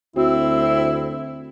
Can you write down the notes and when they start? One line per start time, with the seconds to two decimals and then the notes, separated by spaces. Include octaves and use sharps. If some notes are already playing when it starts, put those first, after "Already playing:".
0.16 D2 C4 E4 F#4